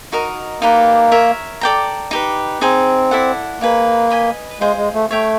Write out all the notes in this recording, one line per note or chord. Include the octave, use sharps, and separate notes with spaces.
D#4 F#4 A#4 D#5
A#3 D#4 G4 B4 D5
A#4 C#5 E5
A4 D5 G5 A#5
D#4 G4 B4
C4 D#4 G#4 C5
E4 A4 D5 F#5
A#3 D#4 G#4 B4
B4 D#5 G#5 B5
G#3 F4 G#4 C5
G#3
A3
A3 C#5 E5 G5